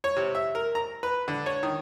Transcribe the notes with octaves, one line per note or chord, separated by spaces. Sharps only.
C#5
C3
E5
A#4
A#5
B4
D3
C#5
D#3